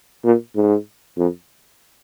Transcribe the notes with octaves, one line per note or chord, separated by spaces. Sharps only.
A#2
G#2
F2